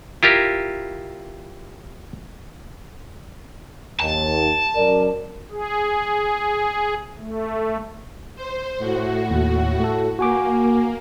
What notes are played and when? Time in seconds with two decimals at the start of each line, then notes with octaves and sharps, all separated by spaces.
0.23 E4 F4 G4 A#4
4.00 D#2 A5
4.75 F#2 A#4 D5
5.51 G#4
7.19 A3
8.36 C5
8.78 A2 F#4
9.30 D#2
9.80 A3 A4
10.19 A#3 F#4 G#5 D6